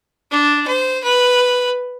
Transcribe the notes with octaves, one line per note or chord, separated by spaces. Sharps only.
D4
C5
B4